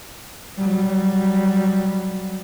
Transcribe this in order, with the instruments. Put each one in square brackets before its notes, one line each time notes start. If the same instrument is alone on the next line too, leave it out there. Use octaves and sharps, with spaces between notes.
[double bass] F#3 G3